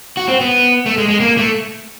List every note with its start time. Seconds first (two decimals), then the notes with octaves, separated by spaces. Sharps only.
0.17 F#4
0.28 C4
0.41 B3
0.86 A3
0.98 G#3
1.08 G#3
1.20 A#3
1.38 A3